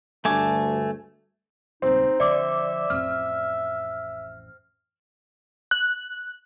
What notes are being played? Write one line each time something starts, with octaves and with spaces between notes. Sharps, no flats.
D2 G2 A3 G#5 D6
D#1 C#2 C4 D#4
D3 F3 D5 E5 D6
A1 F2 F6
F#6